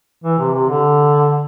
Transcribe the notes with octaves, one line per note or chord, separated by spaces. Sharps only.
E3
C3
C3
D3